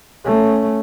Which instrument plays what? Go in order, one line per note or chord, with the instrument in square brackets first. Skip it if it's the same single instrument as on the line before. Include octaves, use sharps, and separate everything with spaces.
[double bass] A3 C#4